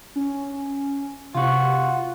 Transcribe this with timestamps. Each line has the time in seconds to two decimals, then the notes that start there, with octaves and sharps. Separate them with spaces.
0.16 C#4
1.35 C3 F4 F#4